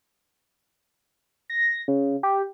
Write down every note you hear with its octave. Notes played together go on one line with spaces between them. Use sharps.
A#6
C#3
G4